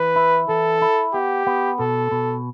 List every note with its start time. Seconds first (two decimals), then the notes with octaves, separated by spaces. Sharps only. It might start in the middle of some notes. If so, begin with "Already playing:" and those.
Already playing: E3 B4
0.16 E4
0.49 E3 A4
0.82 E4
1.13 B3 G4
1.47 B3
1.79 B2 A4
2.11 B2